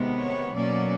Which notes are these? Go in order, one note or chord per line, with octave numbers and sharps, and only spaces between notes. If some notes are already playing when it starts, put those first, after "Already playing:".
Already playing: C3 D#3 G#3 B3
C#5
B2 F#3 A#3 C#4 D5